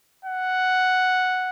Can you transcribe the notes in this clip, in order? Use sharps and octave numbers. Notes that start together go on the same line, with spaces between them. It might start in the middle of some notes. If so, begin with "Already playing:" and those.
F#5